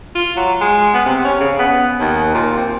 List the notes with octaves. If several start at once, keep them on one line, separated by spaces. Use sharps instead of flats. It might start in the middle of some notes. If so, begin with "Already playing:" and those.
F4
F#3
G#3
B3
C3
C#4
C#3
B3
D#2
A#2
C4